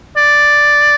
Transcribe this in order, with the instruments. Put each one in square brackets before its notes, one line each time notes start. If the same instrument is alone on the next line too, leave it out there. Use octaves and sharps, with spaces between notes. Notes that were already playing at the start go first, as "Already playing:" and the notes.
[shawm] D5